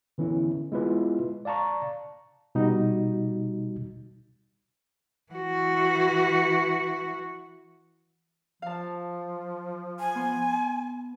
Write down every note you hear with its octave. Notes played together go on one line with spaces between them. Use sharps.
D3 E3 B3 C#4 E4
G#3 B3 E4 F4 B4
D5 F5 A5 A#5 C#6
B2 G3 D#4 F#4
E3 F#4
F3 F5 A5
G#5
B3 C6